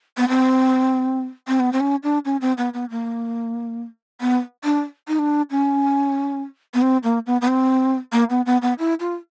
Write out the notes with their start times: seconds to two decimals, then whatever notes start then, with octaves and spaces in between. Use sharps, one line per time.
0.18 B3
0.28 C4
1.48 C4
1.60 B3
1.73 C4
1.80 C#4
2.03 D4
2.25 C#4
2.41 C4
2.58 B3
2.74 B3
2.90 A#3
4.21 B3
4.64 D4
5.08 D#4
5.19 D4
5.51 C#4
6.74 B3
6.82 C4
7.04 A#3
7.26 B3
7.41 B3
7.48 C4
8.12 A#3
8.30 B3
8.46 B3
8.62 B3
8.79 E4
9.00 F4